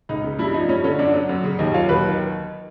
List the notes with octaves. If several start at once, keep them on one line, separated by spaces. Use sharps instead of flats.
C#2 D#4
C#3
G2 E4
F3 D#4
G2 C#4
D3 C#4
F#2 D4
F#3
F#2
C#3
D#2 D#4
F#3 F4
D#2 B4
D#3